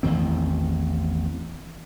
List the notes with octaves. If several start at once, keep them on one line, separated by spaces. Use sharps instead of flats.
A1 E2 D#3 C4